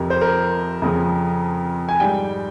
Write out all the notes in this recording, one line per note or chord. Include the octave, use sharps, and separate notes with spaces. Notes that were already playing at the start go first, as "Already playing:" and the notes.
Already playing: F2 C3 F3 A#4
C5
A#4
F2 C#3 F3
G#5
G#2 G3 G5